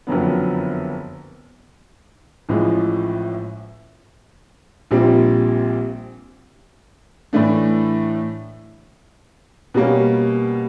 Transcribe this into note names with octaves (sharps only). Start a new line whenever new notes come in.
F#1 F2 D3 F#3 B3
A1 A2 F3 G#3
A#1 A#2 G3 C4
A2 E3 A3 D4
B2 G3 A#3 C#4